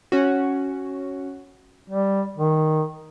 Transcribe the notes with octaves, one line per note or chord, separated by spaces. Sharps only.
C#4 F#4
G3
D#3